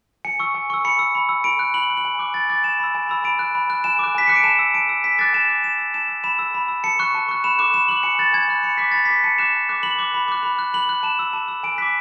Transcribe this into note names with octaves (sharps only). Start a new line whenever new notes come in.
G#5 C#7
C#6 E6
G#5
C#6 E6
B5 C#7
E6
B5
E6
B5 D7
F#6
B5 F#7
F#6
F#7
G#5
D6 F#6
G#5 A6
D6 F#6 A6
G#5 E7
B5 E6
G#5
B5 E6
B5 D7
F#6
B5
F#6
G#5 E7
D6 F#6
G#5 B6
D6 F#6 C#7
D7
A5 E7
E6
A5 D7
E6
G#5 B6
D6 F#6 A6
G#5 E7
D6 F#6
A5 E7
E6
A5 E7
E6
B5 E7
E6
B5
E6
A5 C#7
C#6 F#6
A5
C#6 F#6
B5 E7
D6 F#6 E7
B5 E7
D6 F#6 F#7
G#5 C#7
B5 F#6 A6
G#5 G#6
B5 F#6
B5 C#7
D6 F#6 B6
B5 A6
B6
D6 F#6
A5 C#7
D6 F#6 E7
A5
D6 F#6
B5 F#7
D6 F#6
B5
D6 F#6
B5
F#6
B5 F#7
F#6
A5 E7
E6
A5
E6
G#5 D7
D6 F#6 B6